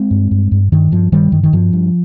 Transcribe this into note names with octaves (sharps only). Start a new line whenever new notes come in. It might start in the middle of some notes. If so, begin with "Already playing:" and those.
Already playing: G#3 C4
G2
G2
G2
G2 D#3
G2 F3
G2 D#3 G3
G2 D#3
D#3
G2 F3
G2